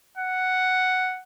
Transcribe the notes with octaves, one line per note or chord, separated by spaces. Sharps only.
F#5